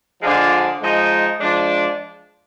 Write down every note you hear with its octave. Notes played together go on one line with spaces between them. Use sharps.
D3 F3 G#3 D4 F4
F3 G#3 D#4
F3 G#3 D4